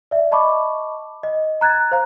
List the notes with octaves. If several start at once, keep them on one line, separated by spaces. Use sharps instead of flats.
D5 E5
D#5 A5 B5 C#6 D6
D#5
A#5 F#6 G#6 A6
C5 F5 A#5